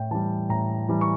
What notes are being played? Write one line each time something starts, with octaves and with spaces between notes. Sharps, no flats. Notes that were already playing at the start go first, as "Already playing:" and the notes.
Already playing: A2 G5
E3 G3 A5
A2 A#5
E3 G3
C#6